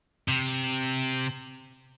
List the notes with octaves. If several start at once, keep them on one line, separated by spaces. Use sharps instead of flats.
C3